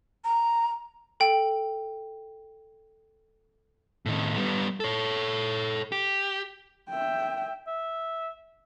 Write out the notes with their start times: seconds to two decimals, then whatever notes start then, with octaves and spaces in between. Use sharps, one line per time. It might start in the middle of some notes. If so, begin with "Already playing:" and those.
0.24 A#5
1.20 A4 G5
4.06 A2 D#3
4.36 G3 B3
4.80 A4 C#5
5.92 G4
6.89 E5 G5
7.67 E5